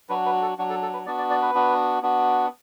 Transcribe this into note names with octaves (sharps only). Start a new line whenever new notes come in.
F#3 D4 F#4 B4
B4
A4
F#3 D4 F#4
A4
A4
B4
B3 D4 F#4 D5
D5
D5
B4
B3 D4 F#4
B3 D4 F#4